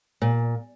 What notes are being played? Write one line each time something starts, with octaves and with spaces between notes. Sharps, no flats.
A#2